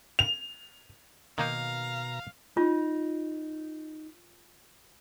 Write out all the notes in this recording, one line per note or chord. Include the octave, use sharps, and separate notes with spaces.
F7
B2 D#3 A#3 D#4 F5 A#5
D#4 F4